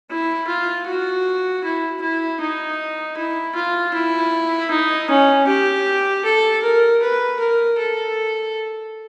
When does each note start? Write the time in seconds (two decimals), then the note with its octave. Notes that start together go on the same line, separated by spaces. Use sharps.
0.10 E4
0.47 F4
0.86 F#4
1.64 E4
2.01 E4
2.40 D#4
3.17 E4
3.55 F4
3.94 E4
4.71 D#4
5.10 C#4
5.47 G4
6.24 A4
6.63 A#4
7.02 B4
7.39 A#4
7.78 A4